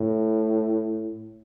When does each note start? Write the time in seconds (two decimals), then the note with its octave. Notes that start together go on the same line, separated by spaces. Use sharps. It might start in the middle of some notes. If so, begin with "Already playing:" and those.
Already playing: A2